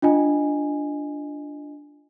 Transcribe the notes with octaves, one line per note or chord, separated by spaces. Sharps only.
D4 F4 D#5 G#5